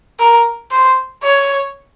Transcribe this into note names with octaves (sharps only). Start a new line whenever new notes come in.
A#4
C5
C#5